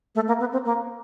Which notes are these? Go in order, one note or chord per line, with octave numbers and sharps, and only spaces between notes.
A3
A#3
B3
C4
A#3